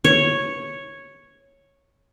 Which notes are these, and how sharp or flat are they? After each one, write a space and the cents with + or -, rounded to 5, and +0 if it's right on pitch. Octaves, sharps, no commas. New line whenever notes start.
C#5 -5